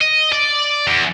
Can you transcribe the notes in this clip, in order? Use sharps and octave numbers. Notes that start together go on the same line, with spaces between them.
D#5
D5
E2